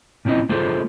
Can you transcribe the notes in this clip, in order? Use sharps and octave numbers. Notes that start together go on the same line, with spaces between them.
A#2 C4 C#4 E4 D#5
G#3 A#3 F4 G#4 A4 C5